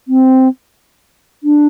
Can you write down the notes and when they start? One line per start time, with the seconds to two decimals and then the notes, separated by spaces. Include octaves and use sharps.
0.08 C4
1.43 D4